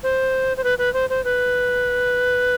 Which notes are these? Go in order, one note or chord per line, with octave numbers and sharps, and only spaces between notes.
C5
C5
B4
B4
C5
C5
B4